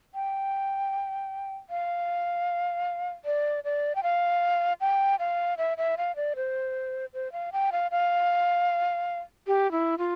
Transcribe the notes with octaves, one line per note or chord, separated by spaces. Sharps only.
G5
F5
D5
D5
G5
F5
G5
F5
E5
E5
F5
D5
C5
C5
F5
G5
F5
F5
G4
E4
F4